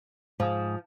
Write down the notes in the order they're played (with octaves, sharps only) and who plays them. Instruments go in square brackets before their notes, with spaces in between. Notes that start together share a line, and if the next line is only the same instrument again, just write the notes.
[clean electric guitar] G#2 G#4 [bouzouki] F3